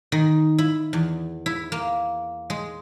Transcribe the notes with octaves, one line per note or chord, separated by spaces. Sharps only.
D#3
E4
E2
E4
A#3
G#3